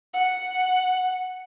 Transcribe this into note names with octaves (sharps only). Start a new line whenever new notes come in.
F#5